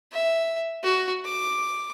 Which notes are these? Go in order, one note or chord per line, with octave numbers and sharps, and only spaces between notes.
E5
F#4
D6